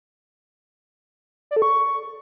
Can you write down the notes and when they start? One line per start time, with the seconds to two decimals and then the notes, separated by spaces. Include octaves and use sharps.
1.51 D5
1.56 A4
1.62 C#6